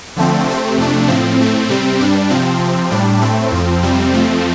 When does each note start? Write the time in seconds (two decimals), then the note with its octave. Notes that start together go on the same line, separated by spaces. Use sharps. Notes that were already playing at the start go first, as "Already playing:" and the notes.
0.16 D3 F3 A3 C4
0.46 C3 A3 C4
0.77 F2 C3 A3 D4
1.08 A2 F3 C4
1.39 A2 A3 C4
1.68 C3 G3 C4
1.99 G2 G3 D4
2.30 C3 F3 C4
2.61 C3 F3 C4
2.91 A2 G3 D4
3.21 A2 A3 C4
3.52 F2 F3 C4
3.82 F2 C3 G3 C4
4.13 F2 F3 A3 C4